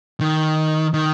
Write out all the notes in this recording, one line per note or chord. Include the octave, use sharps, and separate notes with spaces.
D#3
D#3